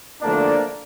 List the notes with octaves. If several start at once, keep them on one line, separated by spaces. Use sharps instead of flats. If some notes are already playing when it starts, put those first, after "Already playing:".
E2 D3 F3 A3 A#3 D4